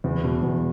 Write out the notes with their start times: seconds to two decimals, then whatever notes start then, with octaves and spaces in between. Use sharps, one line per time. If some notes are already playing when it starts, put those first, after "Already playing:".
0.04 E2
0.24 B2 B3
0.43 E2